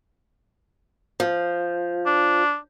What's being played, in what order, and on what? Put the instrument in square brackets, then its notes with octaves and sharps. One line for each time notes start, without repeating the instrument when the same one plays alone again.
[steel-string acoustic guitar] F3
[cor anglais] D4